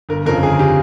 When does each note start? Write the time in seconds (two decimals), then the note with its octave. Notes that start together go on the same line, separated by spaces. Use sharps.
0.09 G1 A#4
0.26 F2 A#4
0.29 C#3
0.43 G1 G#4
0.59 C#3 G4